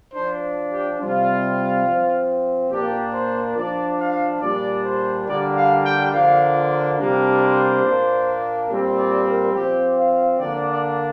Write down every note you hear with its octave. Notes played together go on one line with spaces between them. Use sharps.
F3 D4 C5
G4
C3 G3 C4 F4
F3 C4
A#2 A#3 D4 G4
C5
F3 D4 D5
F5
A#2 G3 D4 D5
C5
D3 G3 A#3 D4 D5
F5
G5
D3 F3 A#3 D4 F5
F4
C3 G3 A#3 D4
C5
A#2 A#3 D4
A#2 G3 C4
D5
A#4
F3 C4 G4
F5
D3 A#3 D4 D5
D5